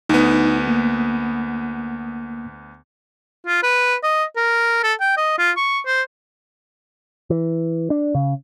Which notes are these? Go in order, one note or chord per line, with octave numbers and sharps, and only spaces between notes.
D2 B3 D#4
A#3
F4
B4
D#5
A#4
A4
G5
D#5
F4
C#6
C5
E3
D4
C#3